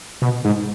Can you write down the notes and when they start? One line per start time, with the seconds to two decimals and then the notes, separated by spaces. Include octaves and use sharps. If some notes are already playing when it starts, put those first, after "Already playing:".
0.22 B2
0.45 G#2